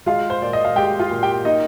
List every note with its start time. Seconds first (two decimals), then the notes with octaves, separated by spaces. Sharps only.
0.06 G#3 F4 F5
0.30 C5
0.42 A#2 D5
0.53 D#5
0.65 F5
0.76 G#3 G4 G5
0.99 F4 F5
1.10 A#2
1.23 G4 G5
1.45 A#3 D#4 D#5